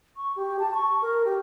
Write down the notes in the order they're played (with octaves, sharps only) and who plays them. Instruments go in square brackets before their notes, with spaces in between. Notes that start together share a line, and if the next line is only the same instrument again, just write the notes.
[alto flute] C#6
G4
A5
C#6
A#4
G4